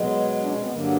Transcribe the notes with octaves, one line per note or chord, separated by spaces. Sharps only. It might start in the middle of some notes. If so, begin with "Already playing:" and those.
Already playing: B2 F#3 G#3
D4
C#4
C4
B3
G2 D3 F#3 A#3